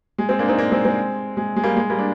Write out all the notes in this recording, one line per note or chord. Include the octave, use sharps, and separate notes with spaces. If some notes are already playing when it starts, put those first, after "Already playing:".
G#3
G#3 C4
A#3 D4
C4 D#4
A#3 D4
G#3 C4
G#3 C4
G#3
G#3
G3 A#3
G#3
G3 A#3
D4